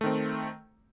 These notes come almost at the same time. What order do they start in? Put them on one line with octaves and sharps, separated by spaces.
A3 D#3 C4